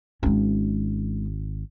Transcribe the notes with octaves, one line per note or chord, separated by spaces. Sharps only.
G#1 G#3 C#4